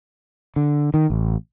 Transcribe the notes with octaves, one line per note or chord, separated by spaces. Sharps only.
D3
D#3
A1